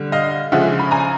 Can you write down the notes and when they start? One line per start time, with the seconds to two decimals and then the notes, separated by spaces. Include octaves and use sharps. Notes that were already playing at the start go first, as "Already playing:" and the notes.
Already playing: D3 G3
0.12 D#5 F5
0.52 C#3 F3 G#3 E5 F#5
0.79 B5
0.91 G#5 A#5